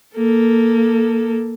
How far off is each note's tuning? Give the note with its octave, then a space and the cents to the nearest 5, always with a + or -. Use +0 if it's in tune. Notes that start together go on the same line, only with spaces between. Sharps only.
A#3 +0 A4 +5